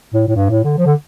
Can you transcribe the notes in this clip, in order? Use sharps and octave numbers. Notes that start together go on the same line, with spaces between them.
A2
A2
G2
A2
D3
F3
D3